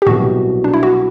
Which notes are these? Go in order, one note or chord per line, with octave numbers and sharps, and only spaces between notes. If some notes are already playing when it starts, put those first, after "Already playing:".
G4
C2 B2 F#3 F#4
D4
E4
F#4